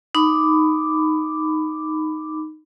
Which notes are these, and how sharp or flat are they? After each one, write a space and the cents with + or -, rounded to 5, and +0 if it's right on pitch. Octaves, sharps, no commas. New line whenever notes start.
D#4 +0 B5 +20 D6 +0